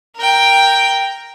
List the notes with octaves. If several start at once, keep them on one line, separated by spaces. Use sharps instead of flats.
A#4 G5